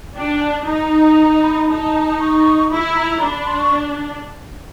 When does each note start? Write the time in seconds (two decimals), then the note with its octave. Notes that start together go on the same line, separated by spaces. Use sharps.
0.16 D4 G5
0.41 A5
0.67 D#4 A#5
1.18 A#5
1.43 B5
1.68 D#4 A5
2.19 C#6
2.70 E4 B5
2.96 A#5
3.21 D4 B5
3.34 B5
3.47 C6
3.59 C#6